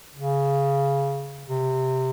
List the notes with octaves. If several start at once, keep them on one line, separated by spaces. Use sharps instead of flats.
C#3
C3